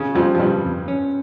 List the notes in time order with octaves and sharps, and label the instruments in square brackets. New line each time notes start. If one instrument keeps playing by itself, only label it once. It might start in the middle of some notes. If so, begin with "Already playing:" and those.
Already playing: [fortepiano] C#3
[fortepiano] F2 F3 [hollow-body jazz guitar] G3
[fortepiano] F3
[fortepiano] G2 G3 [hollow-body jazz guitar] C3
[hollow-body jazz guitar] F2
C#4